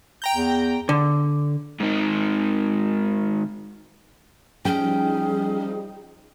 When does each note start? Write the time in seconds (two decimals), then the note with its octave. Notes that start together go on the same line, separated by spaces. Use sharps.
0.22 G5 A#5 G6
0.35 E2
0.89 D3
1.80 G#2 D#3
4.65 F3 G3 C#4 D#4 G#4 G5